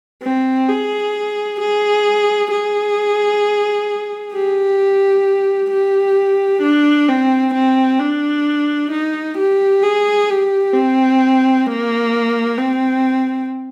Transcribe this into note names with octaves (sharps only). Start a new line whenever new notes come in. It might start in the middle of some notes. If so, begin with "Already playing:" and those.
C4
G#4
G#4
G#4
G4
G4
D4
C4
C4
D4
D#4
G4
G#4
G4
C4
A#3
C4